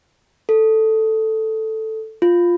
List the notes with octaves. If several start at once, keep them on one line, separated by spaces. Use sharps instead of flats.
A4
F4